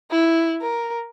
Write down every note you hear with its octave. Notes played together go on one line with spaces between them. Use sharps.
E4
A#4